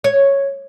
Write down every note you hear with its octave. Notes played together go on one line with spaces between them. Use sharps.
C#5